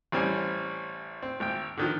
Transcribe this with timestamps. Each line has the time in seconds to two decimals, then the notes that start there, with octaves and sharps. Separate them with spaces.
0.12 A1 G3 C4 C#4 G#5
1.23 C4
1.40 G#1 G5
1.77 D3 D#3 F3